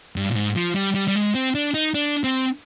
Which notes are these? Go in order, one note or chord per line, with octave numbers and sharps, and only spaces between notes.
G2
A#2
G#2
F3
G3
G3
G3
G#3
C4
D4
D#4
D4
C4